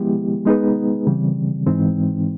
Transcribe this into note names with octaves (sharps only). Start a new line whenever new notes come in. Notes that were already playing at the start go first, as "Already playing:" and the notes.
Already playing: F3 G#3 B3 E4 G4
G#3 B3 D#4 G#4 B4
C#3 E3 G3 C4
G#2 E3 G#3 C4 D#4